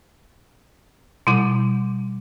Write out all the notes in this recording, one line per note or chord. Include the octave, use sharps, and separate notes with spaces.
B2 G3 E4 D6